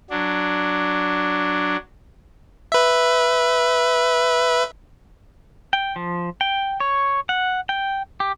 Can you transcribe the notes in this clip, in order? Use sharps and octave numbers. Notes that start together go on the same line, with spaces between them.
F#3 D4
B4 E5
G5
F3
G5
C#5
F#5
G5
G4